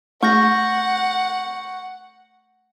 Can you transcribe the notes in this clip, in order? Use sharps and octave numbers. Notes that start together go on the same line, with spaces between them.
A3 F#5 C#6 G6 A#6